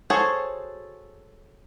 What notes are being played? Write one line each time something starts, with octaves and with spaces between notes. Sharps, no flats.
F#4 G#4 A4 C5 C#5